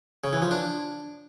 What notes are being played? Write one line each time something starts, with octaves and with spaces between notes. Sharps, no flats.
C#3
E3
F3
D4